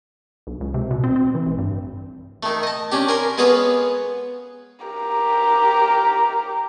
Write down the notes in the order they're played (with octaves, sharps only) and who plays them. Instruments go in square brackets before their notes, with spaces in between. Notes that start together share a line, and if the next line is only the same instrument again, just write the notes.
[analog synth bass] B1
C#2
C3
B2
C4
C4
E3
A1
G2
[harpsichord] D#3 A3
D#5 A5
C#4 D4 G4
A#4 G#5 C6
G#3 B3 G#4 B4 C#5 F5
[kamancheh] G4 A#4